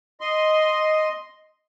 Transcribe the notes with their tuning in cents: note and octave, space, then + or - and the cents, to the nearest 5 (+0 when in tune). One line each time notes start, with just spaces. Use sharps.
D#5 +0 C6 +0